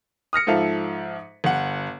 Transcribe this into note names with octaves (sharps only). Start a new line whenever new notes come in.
D#6 F6 A#6 C#7
G#2 F3 A4 E5 F5
G1 F#5